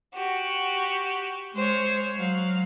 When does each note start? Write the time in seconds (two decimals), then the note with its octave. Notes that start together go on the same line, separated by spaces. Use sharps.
0.14 F#4 G4
1.53 G#3 C5 C#5
2.16 F#3 F5